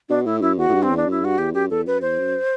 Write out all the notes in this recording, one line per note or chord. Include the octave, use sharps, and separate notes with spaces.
B2 D4
A2 E4
F#2 E4
E2 F#4
A2
G2
C4
E2
D4
F#2 E4
G2 F#4
E2 G4
F#2 G4
E2 A4
F#2 B4
E2 C5
F#2